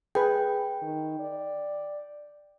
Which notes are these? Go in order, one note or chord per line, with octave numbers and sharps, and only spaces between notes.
G#4 B4 G5
D#3
D5